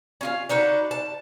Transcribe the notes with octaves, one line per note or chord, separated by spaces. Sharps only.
C#4 F4 F5
D4 D#4 F#4 B4
A5